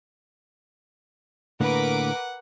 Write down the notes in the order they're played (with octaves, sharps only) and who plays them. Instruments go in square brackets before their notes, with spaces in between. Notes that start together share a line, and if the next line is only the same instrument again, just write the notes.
[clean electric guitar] A2 D3 A#3 [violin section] A#4 B4 D6 [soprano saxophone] F#5